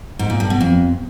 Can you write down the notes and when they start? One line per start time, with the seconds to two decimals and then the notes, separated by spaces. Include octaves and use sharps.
0.19 G#2
0.30 A#2
0.40 G2
0.50 B2
0.60 F2